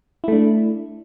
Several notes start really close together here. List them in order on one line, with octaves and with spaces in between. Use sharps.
E4 A3 D4